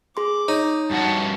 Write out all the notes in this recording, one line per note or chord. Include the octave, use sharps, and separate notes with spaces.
G#4 C6 D6
D#4 C#5
G2 F#4 F#5 A5